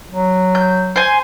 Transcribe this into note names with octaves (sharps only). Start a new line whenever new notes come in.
F#3
G6
C5 G#5